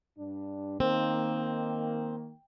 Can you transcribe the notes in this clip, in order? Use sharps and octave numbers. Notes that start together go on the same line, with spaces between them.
G2 D4
D#3 A#3 C4